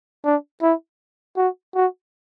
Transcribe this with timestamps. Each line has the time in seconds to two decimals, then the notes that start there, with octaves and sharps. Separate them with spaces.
0.25 D4
0.62 E4
1.37 F#4
1.75 F#4